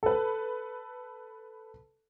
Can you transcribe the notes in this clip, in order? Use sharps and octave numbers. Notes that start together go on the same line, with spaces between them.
A4 B4